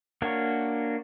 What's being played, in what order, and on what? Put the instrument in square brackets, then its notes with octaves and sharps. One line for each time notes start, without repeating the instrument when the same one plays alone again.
[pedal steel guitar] A#3 D4 F#4 A#4 C#5